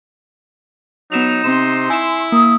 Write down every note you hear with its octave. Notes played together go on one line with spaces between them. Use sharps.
F#3 B3 D#4 E7 F7
C3 C4 C6 E7
E4 G#5 E7
A#3 D#6 E6